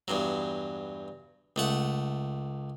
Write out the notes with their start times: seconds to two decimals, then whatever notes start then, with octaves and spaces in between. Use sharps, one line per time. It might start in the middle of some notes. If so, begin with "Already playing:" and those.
0.08 E2 G2 F#3
1.56 C#2 A3 F#5